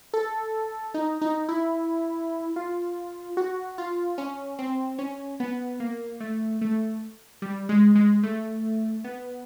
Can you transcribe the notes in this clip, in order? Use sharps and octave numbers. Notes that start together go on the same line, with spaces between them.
A4
D#4
D#4
E4
F4
F#4
F4
C#4
C4
C#4
B3
A#3
A3
A3
G3
G#3
G#3
A3
B3